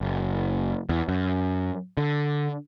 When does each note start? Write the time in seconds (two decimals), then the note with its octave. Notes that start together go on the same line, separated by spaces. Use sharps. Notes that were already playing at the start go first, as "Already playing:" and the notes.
0.01 F#1
0.89 E2
1.09 F#2
1.97 D3